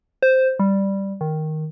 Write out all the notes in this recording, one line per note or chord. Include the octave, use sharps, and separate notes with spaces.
C5
G3
D#3